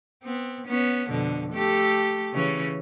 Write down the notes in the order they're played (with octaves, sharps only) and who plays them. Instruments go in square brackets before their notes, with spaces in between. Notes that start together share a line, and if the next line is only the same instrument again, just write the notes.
[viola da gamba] B3 C4
B3 C#4
F2 B2 D3
A3 G4 A4
C#3 E3 C#4